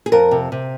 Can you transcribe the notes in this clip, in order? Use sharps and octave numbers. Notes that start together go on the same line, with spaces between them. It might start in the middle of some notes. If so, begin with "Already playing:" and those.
G#4
F2 A#4
C3
C3